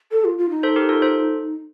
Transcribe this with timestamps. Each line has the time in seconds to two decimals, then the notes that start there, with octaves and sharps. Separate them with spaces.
0.12 A4
0.24 F4
0.38 F4
0.50 D#4
0.63 A4 C5
0.76 G4 A#4
0.89 F4 A4
1.02 A4 C5